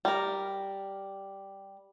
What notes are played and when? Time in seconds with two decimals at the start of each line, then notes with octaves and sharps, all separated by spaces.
0.05 G3 A#4